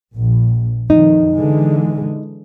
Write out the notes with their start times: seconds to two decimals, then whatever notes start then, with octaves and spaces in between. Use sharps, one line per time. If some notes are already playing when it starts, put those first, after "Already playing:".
0.15 A#1
0.90 F2 D#3 D#4
1.34 D3 E3 G#3